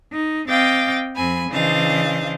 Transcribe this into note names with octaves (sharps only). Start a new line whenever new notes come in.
D#4
C4 D#5 F5 G5 D6 A6
F2 C4 G#5 B5
C#3 E3 D4 C5 D#5 F5